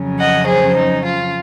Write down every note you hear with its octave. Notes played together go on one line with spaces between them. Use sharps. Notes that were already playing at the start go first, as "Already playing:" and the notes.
Already playing: F2 C#3 F#3 C#4
D#5 F#5
G#4 C5
D#4
F4